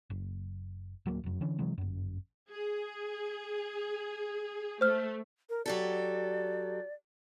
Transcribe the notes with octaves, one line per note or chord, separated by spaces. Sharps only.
F#1
D1 F#3 G#3 A#3
F1 F#2
D3 E3 C#4
C3 E3 F#3 G#3
G1 F#2
G#4
A3 C5 F6
A#4
F#3 G4 A4 D5